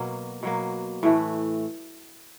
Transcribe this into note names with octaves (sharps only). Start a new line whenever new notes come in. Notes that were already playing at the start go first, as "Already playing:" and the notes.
Already playing: B2 F#3 A#3
B2 F#3 A#3
A2 E3 A3